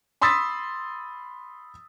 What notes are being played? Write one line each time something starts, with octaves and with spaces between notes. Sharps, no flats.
B5 C6 D#6 E6 A6 B6